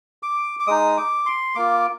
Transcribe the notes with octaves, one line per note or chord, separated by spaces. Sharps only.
D6
D6
G#3 D#4 D#6
D6
C6
A#3 F4 D6